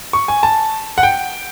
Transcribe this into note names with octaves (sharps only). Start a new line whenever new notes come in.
C#6
G#5
A5
F#5
G5